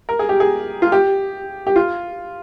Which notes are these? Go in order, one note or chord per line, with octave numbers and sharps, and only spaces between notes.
A#4
G#4
G4
G#4
F4
G4
G4
F4